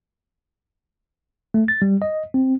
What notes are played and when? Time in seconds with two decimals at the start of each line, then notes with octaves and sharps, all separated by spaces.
1.54 A3
1.68 A6
1.82 G3
2.02 D#5
2.34 C4